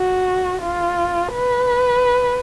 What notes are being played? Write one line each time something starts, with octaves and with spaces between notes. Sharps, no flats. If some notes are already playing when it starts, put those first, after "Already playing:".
Already playing: F#4
F4
B4